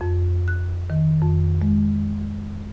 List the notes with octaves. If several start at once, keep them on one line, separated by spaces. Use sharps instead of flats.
F2
F#6
D#3
F2
G#3